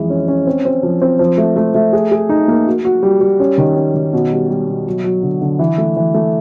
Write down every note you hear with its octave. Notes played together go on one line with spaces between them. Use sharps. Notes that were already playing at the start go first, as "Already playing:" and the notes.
Already playing: F2 E3 G#3
C#4
C#4
C4
C4
F3
C4
F3
A3
A3
A3
G#4
G#4
D#4
A#3
F#4
F#4
G3
G3
C#4
D#3
C#4
D#3
B2
G3
G3
B2
F#3
F#3
D3
D3
E3
A3
E3
A3